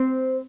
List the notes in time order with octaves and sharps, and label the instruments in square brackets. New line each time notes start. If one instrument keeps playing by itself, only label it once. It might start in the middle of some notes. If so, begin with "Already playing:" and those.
Already playing: [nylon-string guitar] C4 C5